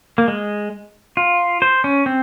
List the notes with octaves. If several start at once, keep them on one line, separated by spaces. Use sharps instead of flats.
A#3
G#3
F4
C5
C#4
C4